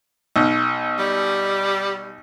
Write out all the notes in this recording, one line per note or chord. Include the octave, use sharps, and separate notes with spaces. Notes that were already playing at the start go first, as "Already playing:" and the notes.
B1
G3